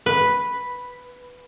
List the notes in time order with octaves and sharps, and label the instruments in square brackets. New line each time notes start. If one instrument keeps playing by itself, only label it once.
[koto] B4